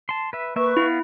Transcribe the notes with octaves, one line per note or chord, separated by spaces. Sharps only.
A5 C6
B4 E5
A#3 B4 E5 C#6
B3 E4 F5